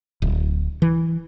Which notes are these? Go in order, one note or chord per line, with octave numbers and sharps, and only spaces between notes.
D1
E3